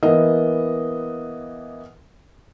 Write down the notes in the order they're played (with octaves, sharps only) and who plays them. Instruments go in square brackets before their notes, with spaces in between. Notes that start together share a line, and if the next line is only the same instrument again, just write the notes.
[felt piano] E3 A#3 B3 D#5